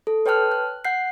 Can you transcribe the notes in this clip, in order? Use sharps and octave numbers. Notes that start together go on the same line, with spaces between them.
A4
B4 C#5 G5 A5 F6 F#6
F#6
F#5 F#6 G6 C7